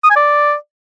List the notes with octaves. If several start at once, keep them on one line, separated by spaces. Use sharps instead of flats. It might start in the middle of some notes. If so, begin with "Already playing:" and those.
D#6
G#5
D5